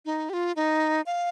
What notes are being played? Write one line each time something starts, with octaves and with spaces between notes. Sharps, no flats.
D#4
G4
F4
D#4
F5